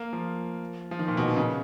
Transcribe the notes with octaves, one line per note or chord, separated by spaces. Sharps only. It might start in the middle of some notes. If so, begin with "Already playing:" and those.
Already playing: A#3
F3
F3
D#3
A#2
B2
D#3
C#3